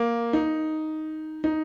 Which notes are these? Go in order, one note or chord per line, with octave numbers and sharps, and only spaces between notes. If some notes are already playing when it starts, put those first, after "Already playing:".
Already playing: A#3
D#4
D#4